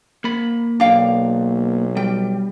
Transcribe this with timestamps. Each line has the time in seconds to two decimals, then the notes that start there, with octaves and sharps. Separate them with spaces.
0.24 A#3 B5
0.80 B1 D4 F5 G5
1.97 G3 G5